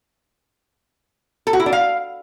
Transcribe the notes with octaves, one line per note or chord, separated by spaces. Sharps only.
A4
F#4
E4
D4
F5